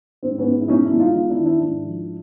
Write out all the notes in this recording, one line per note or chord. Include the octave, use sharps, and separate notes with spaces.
G#2 C4
B3 C#4
G#2
E4
B2 C#4 D#4
D4 E4
G#3
D#4 F4
E2 D#4 F4
D4 E4
D#3
D4 E4
G#2 D4 E4
F3